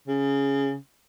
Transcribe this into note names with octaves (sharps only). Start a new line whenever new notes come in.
C#3